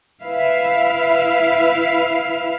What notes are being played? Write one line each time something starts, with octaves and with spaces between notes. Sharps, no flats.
E4 B4 E5 F5